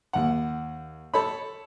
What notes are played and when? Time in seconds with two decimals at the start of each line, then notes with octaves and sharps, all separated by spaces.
0.13 D#2 F#5
1.14 A4 C#5 B5